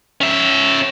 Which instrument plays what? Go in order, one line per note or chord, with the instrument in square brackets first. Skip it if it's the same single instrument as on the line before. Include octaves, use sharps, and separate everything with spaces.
[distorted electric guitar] C#4 E5